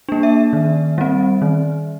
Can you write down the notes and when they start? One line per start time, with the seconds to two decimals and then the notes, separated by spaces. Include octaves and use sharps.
0.09 A#3 D4
0.23 E5
0.53 D#3
0.98 G3 C4
1.42 D#3